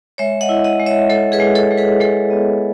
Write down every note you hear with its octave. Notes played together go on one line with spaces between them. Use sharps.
G#3 C#5 E5
D#5 F#5
E4
D#5 F#5
G#3
C#5 E5
G#3 A4 C#5
G#4 B4
G#3
A4 C#5
G#3
G#4 B4
G#3 A4 C#5
B3